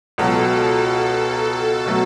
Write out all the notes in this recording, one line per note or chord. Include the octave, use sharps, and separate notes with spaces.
C#2 B2 F#3 A4
B2 F#3 A3